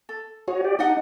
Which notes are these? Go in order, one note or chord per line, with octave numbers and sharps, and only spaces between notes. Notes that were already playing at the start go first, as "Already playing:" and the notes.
A4
F#4 G#4 C#5
G4 D5
D4 D#4 D#5 F#5